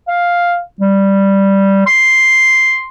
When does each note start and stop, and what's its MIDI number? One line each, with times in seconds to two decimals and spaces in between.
0.08 0.57 77
0.81 1.83 55
1.87 2.89 84